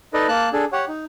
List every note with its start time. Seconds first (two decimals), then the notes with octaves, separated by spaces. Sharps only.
0.14 D#4 A4 B4 D5 D#5
0.28 A#3 A5 F#6
0.53 D4 G#4 A4
0.72 G4 C#5 F#5
0.88 D#4